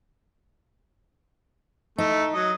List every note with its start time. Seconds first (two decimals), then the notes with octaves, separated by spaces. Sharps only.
1.98 A3 D#4
2.34 F#3 D#5